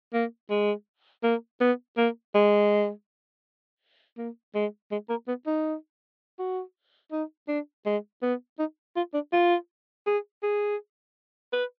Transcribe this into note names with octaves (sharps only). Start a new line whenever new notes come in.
A#3
G#3
A#3
B3
A#3
G#3
A#3
G#3
G#3
A#3
B3
D#4
F#4
D#4
D4
G#3
B3
D#4
F4
D4
F4
G#4
G#4
B4